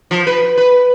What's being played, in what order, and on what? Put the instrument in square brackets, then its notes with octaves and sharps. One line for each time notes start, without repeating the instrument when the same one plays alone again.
[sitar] F3
B4
B4